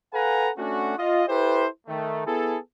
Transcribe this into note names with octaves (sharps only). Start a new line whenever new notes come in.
A4 B4 F5 F#5 G#5 A#5
A3 C#4 D4 F#4
F4 D#5
E4 G4 A4 B4 C5
D#3 A3
B3 E4 G#4 A4